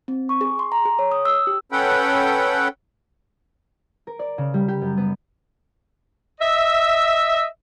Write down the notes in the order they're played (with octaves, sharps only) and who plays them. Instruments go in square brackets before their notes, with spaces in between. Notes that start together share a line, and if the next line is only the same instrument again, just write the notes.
[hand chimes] C4
C#6
G#4
C6
A#5
G#4
C#5
D#6
E6
G4
[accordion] C#4 A4 B4 F#5 G5
[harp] A#4
D5
C#3
G3
G4
F#2
B3
[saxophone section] D#5 E5